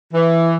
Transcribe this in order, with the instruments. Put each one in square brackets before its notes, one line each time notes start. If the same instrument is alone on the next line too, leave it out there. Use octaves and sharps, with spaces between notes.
[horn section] E3